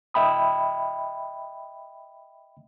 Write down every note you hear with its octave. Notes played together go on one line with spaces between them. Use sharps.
D#5 E5 G5 B5 D#6